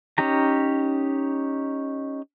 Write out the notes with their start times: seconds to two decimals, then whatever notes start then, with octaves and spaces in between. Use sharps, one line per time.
0.18 C#4 D#4 G4 A#5